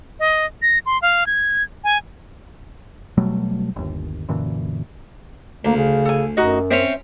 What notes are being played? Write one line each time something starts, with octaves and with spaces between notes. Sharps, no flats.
D#5
A#6
C6
F5
G#6
G#5
B2 F#3 G3 A3
G1 D#2
F#2 A#2 D3 E3
D2 A#3
C#3
A4 G#5
F#2 D#4 F#4 D#5
C4 C#4 C5 E5